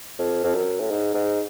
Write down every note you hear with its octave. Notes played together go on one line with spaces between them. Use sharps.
F2
F2
F#2
A2
G#2
G#2